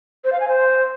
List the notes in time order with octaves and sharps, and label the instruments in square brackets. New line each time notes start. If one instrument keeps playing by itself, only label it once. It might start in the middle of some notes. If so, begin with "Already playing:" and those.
[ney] C5
F5
G#5
C5